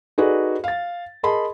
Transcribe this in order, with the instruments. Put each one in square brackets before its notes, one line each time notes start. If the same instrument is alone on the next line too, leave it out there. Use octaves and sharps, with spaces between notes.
[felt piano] D#4 F#4 G#4 A4 B4 D5
F5 A6
G#4 A#4 D#5 A5 B5 C6